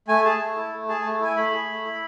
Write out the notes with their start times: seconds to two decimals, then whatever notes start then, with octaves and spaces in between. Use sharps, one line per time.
0.08 A3 G#5
0.24 G#4 A5
0.41 A3
0.56 E4
0.72 A3
0.89 G#4 A5
1.01 A5
1.05 A3
1.20 E4 G#5
1.36 A3 B5
1.52 G#4
1.69 A3
1.85 E4